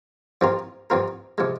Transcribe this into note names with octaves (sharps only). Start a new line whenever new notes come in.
G2 F3 C4 F4 A#4
G2 F3 C4 F4 A#4
C3 F3 G#3